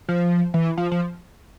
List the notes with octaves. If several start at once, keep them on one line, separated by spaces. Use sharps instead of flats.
F3
E3
F3
F3